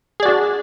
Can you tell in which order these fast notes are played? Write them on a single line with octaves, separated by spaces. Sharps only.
G#4 D5 F#4 D4